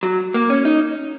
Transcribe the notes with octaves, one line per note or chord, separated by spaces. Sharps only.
F#3
A#3
C#4
D#4